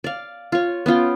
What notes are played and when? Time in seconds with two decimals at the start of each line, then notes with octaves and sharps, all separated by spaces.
0.04 D5 F5
0.52 F4 C#5
0.86 B3 C#4 F4 G5